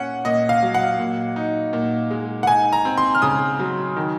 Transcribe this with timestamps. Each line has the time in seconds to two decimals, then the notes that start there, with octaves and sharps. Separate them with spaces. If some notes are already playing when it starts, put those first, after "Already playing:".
Already playing: A#2 C#4 F#5
0.25 A#2 D#5
0.49 F5
0.63 F#3
0.74 F#5
0.99 A#2
1.36 D#4
1.73 A#2
2.11 G#3
2.43 F#5
2.47 D#4 G#5
2.73 A#5
2.85 C4
2.98 C6
3.15 F6
3.22 C#3 D#6
3.59 F#3
3.97 D#3